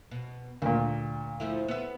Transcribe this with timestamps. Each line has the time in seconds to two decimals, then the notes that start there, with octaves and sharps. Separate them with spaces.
0.11 B2
0.62 D2 A#2 A#3
1.40 F3 A3 E4
1.68 B3 E5